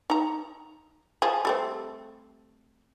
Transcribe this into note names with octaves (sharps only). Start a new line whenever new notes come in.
D#4 A#5
F3 G#4
G3 A3 C4